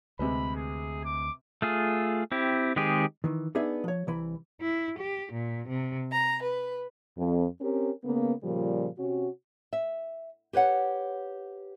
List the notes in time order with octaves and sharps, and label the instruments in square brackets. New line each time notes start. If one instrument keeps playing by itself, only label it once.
[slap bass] D2 [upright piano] C3 G#3 B4 [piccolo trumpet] B5
[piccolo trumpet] G#4
D6
[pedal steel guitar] A3 F4 G#4
C4 E4 G4
D#3 G#3 C4 G4 G#4
[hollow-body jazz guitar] D#3 E3
B3 D4 D#4 G#4 E5
F3 C#5
C2 E3 B5
[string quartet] E4
G4
A#2
C3
A#5
B4
[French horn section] F2
C4 C#4 G4 A#4
C#3 A#3 B3
A#2 C#3 F3 G3
C3 C#4 F#4
[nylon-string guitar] E5
G4 B4 C#5 F#5